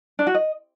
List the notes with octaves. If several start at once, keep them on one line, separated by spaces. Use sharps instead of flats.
D4
F#4
D#5